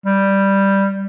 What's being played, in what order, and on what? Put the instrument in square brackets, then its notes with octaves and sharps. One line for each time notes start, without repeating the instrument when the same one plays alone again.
[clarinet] G3